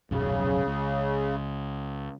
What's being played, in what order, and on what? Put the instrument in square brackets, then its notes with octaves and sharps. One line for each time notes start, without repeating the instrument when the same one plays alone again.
[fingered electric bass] D#1 B1 F#2 [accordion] C#3
[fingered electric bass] C#2